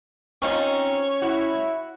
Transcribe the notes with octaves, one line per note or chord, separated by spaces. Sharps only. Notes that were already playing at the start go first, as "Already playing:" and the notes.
C4 C#4 D#4 F4 C#5
E4 F#4